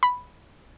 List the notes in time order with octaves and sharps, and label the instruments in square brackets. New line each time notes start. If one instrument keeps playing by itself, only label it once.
[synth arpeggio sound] B5